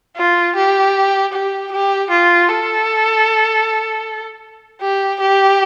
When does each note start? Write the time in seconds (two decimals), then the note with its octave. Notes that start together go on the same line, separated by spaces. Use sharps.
0.17 F4
0.56 G4
1.33 G4
1.71 G4
2.10 F4
2.49 A4
4.81 G4
5.20 G4